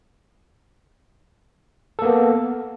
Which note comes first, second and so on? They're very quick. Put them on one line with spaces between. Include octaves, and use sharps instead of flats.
A4 A#3 B3